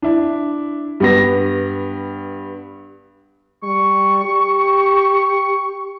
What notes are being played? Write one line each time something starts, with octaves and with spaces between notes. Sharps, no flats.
D4 E4
G2 B3 A#6
G3 C#6
G4